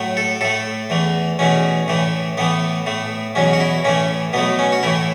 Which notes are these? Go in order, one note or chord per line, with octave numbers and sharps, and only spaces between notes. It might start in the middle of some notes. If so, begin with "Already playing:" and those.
Already playing: A2 F#3 A3
A4
A2 A3 A4
E2 E3 A3
E2 B2 A3 C#4
A2 E3 A3
A2 E3 A3 B3
A2 A3
E2 B2 F#3 C#4
F#4
E4
A2 E3 A3 C#4
B2 F#3 A3 B3
C#4
F#4
A2 E3 A3 E4